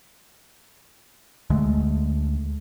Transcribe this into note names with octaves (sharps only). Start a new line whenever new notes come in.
D2 D3 G#3 A3